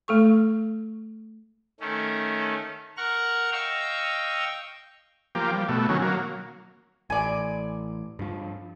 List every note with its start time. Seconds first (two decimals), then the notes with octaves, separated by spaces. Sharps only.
0.08 A3 A4 C#6
1.80 D#3 A3 C#4
2.97 A#4 F#5 C#6 F6
3.52 D#5 F5 G5 C#6 E6
5.35 F3 A#3 G4
5.54 G3
5.68 B2 A3
5.89 D#3 F#3 C#4
6.02 F#3 A#3
7.10 A1 D5 G#5
8.19 G2 F3